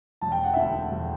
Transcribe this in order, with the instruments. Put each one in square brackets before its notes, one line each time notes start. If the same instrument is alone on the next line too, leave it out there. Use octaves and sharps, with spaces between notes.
[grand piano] E1 A5
G5
F#5
D2 D3 E5 G5
E1